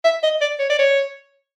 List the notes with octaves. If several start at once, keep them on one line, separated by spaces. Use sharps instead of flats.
E5
D#5
D5
C#5
D5
C#5